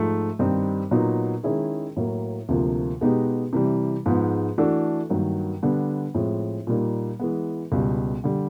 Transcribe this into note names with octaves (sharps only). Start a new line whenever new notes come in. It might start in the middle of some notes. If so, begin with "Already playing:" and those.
Already playing: G#2 F3 A3
G2 D#3 G3 C4 D#4
A#2 F#3 B3 D#4
D#3 G#3 C#4 E4 G#4
A2 F#3 A#3
D2 C3 F3 A#3
B2 G#3 B3 D#4 G4
C3 E3 G3
G#2 F3 G#3 B3
E3 A3 D4 F#4 A4
G2 D#3 F#3 A#3
D3 G3 B3 D4
A2 F3 G#3 C4
A#2 G3 A#3 D#4
E3 G#3 B3
C#2 B2 G3
D3 G3